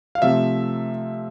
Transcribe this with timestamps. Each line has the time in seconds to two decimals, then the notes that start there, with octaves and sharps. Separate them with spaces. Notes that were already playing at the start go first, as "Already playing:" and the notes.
0.15 F5
0.22 C3 F3 A3 E5